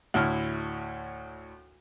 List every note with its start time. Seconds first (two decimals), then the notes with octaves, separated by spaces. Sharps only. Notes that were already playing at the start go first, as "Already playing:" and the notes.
0.14 D2 A2 E4 F6